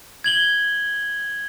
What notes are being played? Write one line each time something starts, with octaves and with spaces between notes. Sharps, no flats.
G#6 F#7 G7